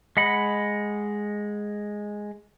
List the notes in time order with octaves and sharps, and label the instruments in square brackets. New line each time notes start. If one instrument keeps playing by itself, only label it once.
[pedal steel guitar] G#3 D#5 F#5 B5